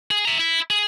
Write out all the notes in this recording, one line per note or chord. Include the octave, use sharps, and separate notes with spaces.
G#4
E5 A#5
E4
G#4